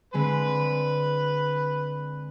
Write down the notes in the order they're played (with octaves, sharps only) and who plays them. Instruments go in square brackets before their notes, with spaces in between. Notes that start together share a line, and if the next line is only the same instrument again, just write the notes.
[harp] D3 G#3 C4 [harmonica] B4